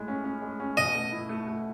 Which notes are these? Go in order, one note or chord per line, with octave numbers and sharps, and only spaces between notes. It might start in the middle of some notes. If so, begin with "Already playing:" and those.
Already playing: A2 G#3
C#4
C#4
G#3
C#4
B2 D#5
A3
E4
A3
A3